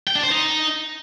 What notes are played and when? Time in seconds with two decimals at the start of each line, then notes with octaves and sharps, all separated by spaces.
0.07 G5
0.15 D4
0.23 C5
0.31 D#4